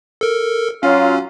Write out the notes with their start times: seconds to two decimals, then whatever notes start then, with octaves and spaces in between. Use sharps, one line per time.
0.21 A4 A#4
0.83 F#3 C#4 F4